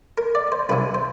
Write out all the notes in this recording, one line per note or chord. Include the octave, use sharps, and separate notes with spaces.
A#4
D5
C5
C2 C3 E3 B4
C5